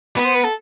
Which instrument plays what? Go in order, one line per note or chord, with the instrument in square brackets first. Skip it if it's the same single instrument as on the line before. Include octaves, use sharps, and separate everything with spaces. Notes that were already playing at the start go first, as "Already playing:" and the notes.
[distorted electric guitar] B3 [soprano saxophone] B4
[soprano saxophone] C5
B4
A4